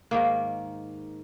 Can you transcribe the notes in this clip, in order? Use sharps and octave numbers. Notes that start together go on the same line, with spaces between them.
G#2 D#3 A#3